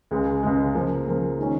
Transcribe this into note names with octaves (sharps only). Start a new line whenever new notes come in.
C#2 C#3 G#3
C#2 C#3 G#3
C#3 F3 A#3
C#3 F3 A#3
D#3 G#3 C#4